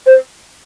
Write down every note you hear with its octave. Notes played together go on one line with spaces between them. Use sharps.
C5